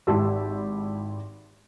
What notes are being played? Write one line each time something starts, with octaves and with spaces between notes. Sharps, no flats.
G#1 E4 G4 A5 C6 E6